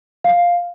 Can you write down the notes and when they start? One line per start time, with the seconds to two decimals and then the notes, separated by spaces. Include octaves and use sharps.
0.24 F5